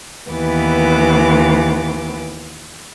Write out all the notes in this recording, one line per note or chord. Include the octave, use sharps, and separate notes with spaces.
D#2 E3 B3 D6